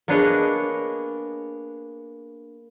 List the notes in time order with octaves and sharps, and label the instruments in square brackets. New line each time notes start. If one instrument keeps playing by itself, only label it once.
[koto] A#3 B3 D4 G#4 C#5 D#5